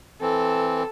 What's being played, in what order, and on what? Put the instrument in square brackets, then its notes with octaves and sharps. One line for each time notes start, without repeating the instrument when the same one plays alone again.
[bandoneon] E3 C4 [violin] A4